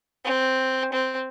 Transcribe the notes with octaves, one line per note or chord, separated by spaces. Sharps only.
C4
C4